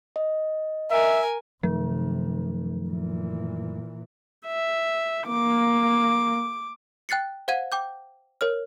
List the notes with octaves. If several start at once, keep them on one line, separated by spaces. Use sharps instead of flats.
D#5
A#4 E5 G#5
F#2 C3 D#3 F3 A3
A#2 E3
E5
A#3 D6
G5 F#6 A6 C7 C#7
C5 F5 F#5 G#6 D#7
G5 D6 G6
A#4 C#5 F6